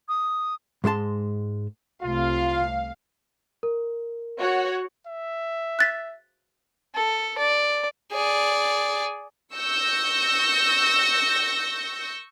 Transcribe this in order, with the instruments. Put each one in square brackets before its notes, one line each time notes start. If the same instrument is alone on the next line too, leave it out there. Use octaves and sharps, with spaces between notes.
[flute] D#6
[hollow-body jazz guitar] G#2 G#3 E4 A5 C6
[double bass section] C2 C3 A3 [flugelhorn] F4 [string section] F5
[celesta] A#4
[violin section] F#4 C#5 F#5
[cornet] E5
[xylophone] F#6 A6 B6
[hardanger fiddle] A4
D5
[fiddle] G#4 D5
[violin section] C#6 E6 G6 A#6 C#7